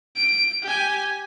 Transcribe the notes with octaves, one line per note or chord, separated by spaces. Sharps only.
D7
G4 G#5